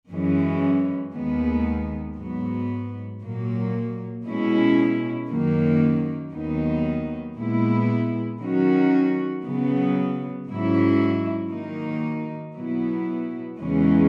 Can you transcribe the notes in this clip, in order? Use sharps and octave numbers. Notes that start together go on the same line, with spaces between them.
F#2 E3 G#3 C#4
D#2 D#3 G#3 B3
G#2 F#3 B3
A#2 F#3 A#3
B2 G#3 C#4 E4
F#2 D#3 F#3 A#3
D#2 D#3 F#3 B3 D#4
A#2 G#3 B3 E4
D#3 F#3 C#4 F#4
C#3 F#3 B3
G#2 F#3 C#4 E4
D#3 F#3 A#3 D#4
B2 F#3 B3 E4
E2 C#3 E3 G#3 C#4